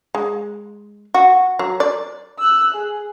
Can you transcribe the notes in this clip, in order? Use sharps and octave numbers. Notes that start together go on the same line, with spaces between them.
G#3
F#4
F#3
D5
E6 F#6
G#4